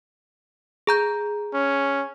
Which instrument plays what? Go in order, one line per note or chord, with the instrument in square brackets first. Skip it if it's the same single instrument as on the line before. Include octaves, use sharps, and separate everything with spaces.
[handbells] G#4 A#5 G6
[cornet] C#4